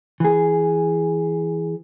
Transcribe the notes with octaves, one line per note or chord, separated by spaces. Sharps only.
E3 G#4